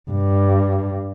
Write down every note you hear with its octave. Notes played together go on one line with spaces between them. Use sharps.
G2